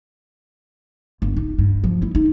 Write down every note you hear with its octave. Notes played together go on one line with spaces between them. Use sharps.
G1
D#4
G2
F3
E4
D#4